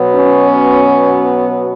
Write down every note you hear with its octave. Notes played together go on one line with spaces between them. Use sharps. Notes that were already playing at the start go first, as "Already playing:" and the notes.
Already playing: B2 F#3 B3
C#4